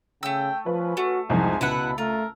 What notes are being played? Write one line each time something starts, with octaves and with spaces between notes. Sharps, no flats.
C#3 A3 G5 E6
F3 C#4 B4
A3 F#4
C2 F2 G#2 C3 C5 G#5
C#2 B2 E4 A4 B4 F#5 B5
A3 F4 A4 A#4